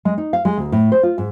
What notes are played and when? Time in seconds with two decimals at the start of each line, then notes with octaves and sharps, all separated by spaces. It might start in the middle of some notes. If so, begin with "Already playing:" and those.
0.05 G#3
0.18 D#4
0.33 F5
0.45 G#3
0.58 D2
0.72 A2
0.92 C5
1.03 F4
1.18 G#2